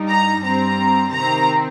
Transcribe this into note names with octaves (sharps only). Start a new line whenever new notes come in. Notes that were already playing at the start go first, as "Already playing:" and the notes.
Already playing: G2 G3 D#4
A#5
G2 G3 C4 A#5
C3 D#3 C4 A#5